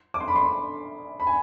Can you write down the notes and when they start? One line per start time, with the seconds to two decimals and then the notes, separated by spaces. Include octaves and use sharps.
0.14 D6
0.20 C6
0.28 B5
0.36 C6
1.20 B5
1.27 G#5